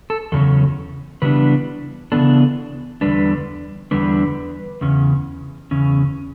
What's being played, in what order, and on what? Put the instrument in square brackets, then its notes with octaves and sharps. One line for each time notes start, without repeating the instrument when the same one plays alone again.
[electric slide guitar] A4
E2 C#3 F#3 C#4 A4
C#3 E3 G3 B3 D4 B4
C#3 E3 G3 B3 D4 A4
E2 D3 G3 D4 B4
E2 D3 G3 D4 B4
E2 C#3 C#4
E2 C#3 C#4